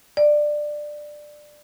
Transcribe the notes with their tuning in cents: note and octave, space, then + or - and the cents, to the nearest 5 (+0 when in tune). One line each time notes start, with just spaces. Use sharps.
D5 +15